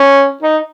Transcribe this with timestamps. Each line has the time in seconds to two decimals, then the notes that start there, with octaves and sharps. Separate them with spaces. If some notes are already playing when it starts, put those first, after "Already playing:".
Already playing: C#4
0.42 D#4